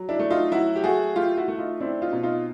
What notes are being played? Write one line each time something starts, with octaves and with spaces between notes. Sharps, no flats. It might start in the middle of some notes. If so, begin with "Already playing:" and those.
Already playing: F#3
D4 E4
A3
D#4 F4
F#3 E4 F#4
G4
A3 F#4 G#4
A3 F4 G4
E4 F#4
A3
D#4 F4
C4 D4 E4
D#4 F4
B2
D#4 F4